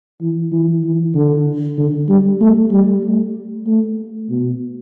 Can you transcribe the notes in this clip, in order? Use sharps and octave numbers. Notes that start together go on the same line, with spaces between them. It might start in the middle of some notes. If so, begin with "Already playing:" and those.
E3
E3
E3
D3
D3
G3
A3
G3
A3
A3
B2